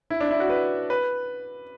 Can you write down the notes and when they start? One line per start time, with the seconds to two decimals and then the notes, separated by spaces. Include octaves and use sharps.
0.10 E4
0.20 D4
0.31 E4
0.40 F#4
0.50 B4
0.90 B4